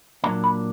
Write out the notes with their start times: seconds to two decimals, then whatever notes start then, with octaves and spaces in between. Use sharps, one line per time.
0.24 A#2 F#3 A#3 D4 A#5
0.44 B5